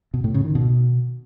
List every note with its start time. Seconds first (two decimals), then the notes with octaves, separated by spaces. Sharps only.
0.14 B2
0.24 A2
0.34 C#3
0.45 D#3
0.55 B2